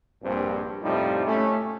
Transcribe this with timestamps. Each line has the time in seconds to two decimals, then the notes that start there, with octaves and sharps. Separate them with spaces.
0.24 A#1 G2 C4
0.83 F2 A2 C3 F3 G3 D#4
1.26 A3 C#4